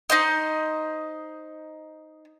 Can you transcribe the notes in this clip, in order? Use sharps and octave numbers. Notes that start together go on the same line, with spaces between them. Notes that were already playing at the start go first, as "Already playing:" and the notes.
D#4 C5 D#5